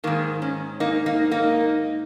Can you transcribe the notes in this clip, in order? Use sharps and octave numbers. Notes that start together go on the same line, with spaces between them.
G#2 D#3 A#3
C#4
A#3 D#4
A#3 D#4
A#3 D#4